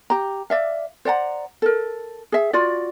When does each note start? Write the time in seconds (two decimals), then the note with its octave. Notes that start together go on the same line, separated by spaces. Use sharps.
0.10 G4 A#5
0.50 D5 E5 F5
1.05 C5 D5 F#5 A#5
1.62 A4 A#4
2.32 G#4 E5
2.53 F4 F#4 D5